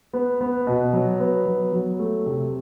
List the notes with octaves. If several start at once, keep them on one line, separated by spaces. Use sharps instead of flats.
B3
B3
B2
F#3
B3
F#3
F#3
A3
C3